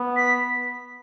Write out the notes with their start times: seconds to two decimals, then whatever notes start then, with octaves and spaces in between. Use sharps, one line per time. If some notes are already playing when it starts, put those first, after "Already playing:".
Already playing: B3
0.17 B6